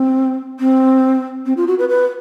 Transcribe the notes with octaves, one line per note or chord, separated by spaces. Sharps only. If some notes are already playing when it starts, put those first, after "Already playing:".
Already playing: C4
C4
C4
F4
F#4
B4
B4